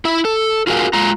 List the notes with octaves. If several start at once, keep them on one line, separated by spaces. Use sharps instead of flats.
E4 E5
A4
F4 F#4 G#4 A#4 D#5 F5
G#3 F4 A#5